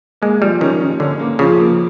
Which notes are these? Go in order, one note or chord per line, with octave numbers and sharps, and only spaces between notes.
G#3 A#3
F3 G3
D#3 C#4
C#4
D3 C#4
A#3
C#3 F3
A#3